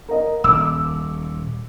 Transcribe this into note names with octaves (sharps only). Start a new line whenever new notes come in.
A#4 D#5
D#1 D6 E6